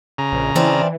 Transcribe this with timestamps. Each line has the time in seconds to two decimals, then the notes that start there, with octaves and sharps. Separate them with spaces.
0.18 C#3 A#5
0.32 A#1
0.55 E3 C4 D4 F4